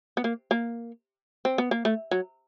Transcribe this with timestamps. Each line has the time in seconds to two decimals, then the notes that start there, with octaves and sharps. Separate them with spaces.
0.17 B3
0.24 A#3
0.51 A#3
1.45 C4
1.58 B3
1.71 A#3
1.85 A3
2.11 F#3